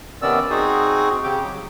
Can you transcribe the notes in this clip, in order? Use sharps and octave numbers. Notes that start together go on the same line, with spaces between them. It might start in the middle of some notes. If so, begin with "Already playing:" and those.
C3 D#3 B3 C#4 D5 E6
C4 D#4 F#4 G#4
C#3 G4 D6
F#3